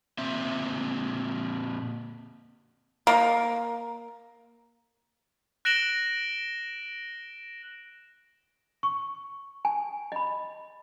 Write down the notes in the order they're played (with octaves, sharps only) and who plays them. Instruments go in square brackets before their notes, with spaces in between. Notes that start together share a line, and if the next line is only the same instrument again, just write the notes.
[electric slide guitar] A#2 C4 E5
[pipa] A#3
[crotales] F#6 A#6 D7 E7 F#7 G7
[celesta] C#6
[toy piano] G#5
D#5 B5